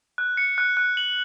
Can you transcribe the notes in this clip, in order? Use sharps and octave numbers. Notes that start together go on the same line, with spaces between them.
F#6
C#7
F#6
F#6
F#7